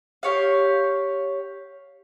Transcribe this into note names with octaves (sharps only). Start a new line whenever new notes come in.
G4 C#5 F5